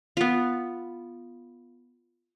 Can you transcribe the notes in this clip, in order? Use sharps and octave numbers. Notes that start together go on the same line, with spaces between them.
B3 F4